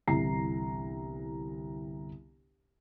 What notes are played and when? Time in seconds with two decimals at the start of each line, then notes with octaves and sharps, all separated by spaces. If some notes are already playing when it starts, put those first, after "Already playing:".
0.07 G1 C2 E3 A#5 C7